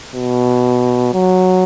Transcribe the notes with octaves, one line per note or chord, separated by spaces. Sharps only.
B2
F#3